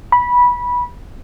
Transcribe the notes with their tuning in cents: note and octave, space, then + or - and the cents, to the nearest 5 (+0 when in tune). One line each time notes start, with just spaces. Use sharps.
B5 -15